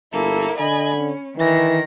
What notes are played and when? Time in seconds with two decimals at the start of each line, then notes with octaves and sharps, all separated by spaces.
0.13 G1 A#3 E4 A4
0.60 D3 D#5 G#5 B5
0.97 C#4
1.38 D#3 E3 A#6